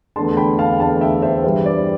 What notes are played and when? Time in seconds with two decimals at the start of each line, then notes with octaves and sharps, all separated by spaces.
0.16 E2 D3 A3 D4 A5 C6
0.37 G5 B5
0.59 F5 A5
0.80 E2 D3 A3 D4 F5 A5
1.01 E5 G5
1.22 C5 E5
1.44 G2 E3 G3 C5
1.66 D5